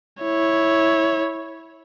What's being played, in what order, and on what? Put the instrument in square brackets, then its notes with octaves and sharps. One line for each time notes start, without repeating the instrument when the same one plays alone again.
[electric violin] E4 C#5